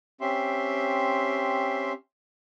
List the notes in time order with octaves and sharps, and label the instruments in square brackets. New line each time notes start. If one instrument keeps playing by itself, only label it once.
[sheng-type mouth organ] C4 C#4 G4 E5 C6